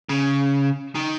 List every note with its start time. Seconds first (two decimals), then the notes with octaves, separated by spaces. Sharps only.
0.09 C#3
0.95 D#3